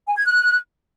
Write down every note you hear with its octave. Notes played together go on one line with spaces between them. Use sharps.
G#5
G#6
F#6